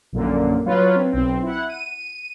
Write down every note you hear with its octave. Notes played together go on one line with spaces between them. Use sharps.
A#1 F#2 A#2 D3 A#3
F#3 F4 B4 C#5
C4
B1 C4
E4 F#5
D#7